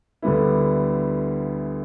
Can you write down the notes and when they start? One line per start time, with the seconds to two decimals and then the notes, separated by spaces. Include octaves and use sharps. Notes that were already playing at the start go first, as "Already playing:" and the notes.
0.22 D2 D3 G3 B3 E4